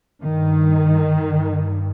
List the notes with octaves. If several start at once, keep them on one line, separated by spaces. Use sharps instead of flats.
G2 D#3
G2